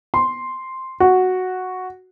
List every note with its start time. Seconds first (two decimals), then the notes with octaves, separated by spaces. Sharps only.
0.14 C6
1.00 F#4